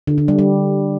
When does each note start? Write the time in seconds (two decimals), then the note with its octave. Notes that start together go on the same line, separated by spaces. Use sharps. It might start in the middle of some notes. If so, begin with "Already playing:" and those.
0.07 D3
0.18 D3
0.28 G3
0.39 G3